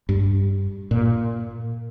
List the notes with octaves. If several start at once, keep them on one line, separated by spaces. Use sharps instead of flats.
G2
A#2